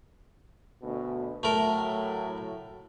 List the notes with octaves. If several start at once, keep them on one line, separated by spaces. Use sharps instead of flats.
D2 B2
A2 F#3 A3 A#4